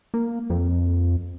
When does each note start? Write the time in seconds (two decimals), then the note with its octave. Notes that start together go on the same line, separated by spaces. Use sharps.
0.14 A#3
0.50 F2